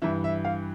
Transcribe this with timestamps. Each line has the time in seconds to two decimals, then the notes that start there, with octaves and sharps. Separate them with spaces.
0.02 G2 E3 E5
0.24 E5
0.45 F5